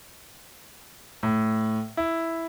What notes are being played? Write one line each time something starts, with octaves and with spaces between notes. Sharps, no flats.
A2
E4